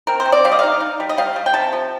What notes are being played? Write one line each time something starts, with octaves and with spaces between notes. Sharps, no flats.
C4 A#4
C5
C4
D5
G3 F5
D#5
D#4 F5
D#4
G3
D#5
G3 F5
G3
G5
C3 A5
F3